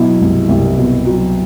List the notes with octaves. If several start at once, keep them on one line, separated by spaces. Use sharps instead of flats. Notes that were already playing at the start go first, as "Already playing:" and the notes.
Already playing: B2 F#3 E4
C2
C2
B2
F#3